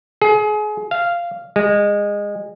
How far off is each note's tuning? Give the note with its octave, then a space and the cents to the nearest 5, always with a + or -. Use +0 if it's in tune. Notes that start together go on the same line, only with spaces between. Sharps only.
G#4 +30
F5 -10
G#3 -20